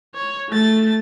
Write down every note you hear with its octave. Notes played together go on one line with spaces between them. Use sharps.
C#5
A3 A6